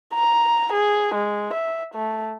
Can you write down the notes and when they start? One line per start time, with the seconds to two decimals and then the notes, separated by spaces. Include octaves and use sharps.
0.14 A#5
0.73 G#4
1.15 G#3
1.53 E5
1.95 A3